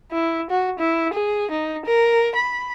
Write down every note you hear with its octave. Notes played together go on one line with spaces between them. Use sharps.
E4
F#4
E4
G#4
D#4
A#4
B5